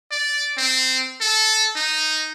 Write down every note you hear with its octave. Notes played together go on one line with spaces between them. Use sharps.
D5
C4
A4
D#4